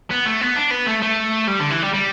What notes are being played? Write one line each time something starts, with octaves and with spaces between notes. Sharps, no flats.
B3
A3
B3
D4
B3
A3
A3
G3
D3
E3
G3
G3